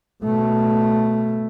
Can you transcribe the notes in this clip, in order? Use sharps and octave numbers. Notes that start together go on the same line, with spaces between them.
B2 A3